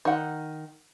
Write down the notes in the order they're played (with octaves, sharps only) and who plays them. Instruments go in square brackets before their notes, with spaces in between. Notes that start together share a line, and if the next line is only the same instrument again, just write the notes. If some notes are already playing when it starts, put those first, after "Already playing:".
[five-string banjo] D#3 F#5